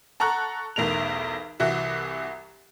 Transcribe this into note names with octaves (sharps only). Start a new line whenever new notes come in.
A4 F#5 A#5 C#6 F#6
B1 E2 A3 A#4 F7
C2 E3 F#4 E5